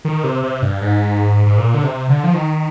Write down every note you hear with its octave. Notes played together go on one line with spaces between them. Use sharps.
D#3
C3
C3
G2
G#2
G#2
A#2
D3
C3
D3
F3
D#3